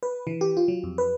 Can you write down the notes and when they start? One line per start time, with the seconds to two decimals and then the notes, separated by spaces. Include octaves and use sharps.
0.03 B4
0.27 E3
0.41 G4
0.57 F4
0.68 F#3
0.84 F2
0.98 B4